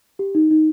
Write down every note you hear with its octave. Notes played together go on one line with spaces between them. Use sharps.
G4
D#4
D#4